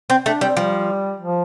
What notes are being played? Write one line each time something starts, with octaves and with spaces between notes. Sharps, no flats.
C4
A3 D4
G3 C4
F3 G3
F3